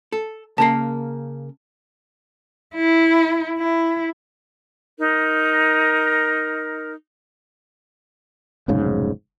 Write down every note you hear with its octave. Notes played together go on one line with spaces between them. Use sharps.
A4
C#3 A#3 A#4 A5 C7
E4
E4
D#4 A#4
F1 B1 G#2 C#3